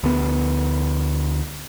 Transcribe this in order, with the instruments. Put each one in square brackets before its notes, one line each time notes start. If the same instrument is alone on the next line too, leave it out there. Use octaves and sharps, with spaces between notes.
[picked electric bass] D2 B3